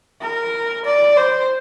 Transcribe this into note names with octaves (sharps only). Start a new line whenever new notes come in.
A#4
D5
C5